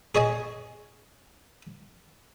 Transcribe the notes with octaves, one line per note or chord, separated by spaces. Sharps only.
G#4 C#5 D#5 G#5